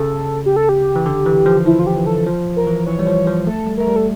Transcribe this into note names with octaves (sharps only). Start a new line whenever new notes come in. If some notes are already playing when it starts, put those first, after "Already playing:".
Already playing: C#3 A4
G4
A4
G4
E3
D3
E3
F3
F3 E4
F4
G4
E3
A4
F3
A#4
E3
E3 C#5
G3
F3
F3
A3 A4
G3
A3 A#4
G3
A4